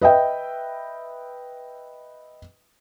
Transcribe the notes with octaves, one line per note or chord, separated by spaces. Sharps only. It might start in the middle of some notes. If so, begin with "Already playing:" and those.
B4 D#5 E5 G5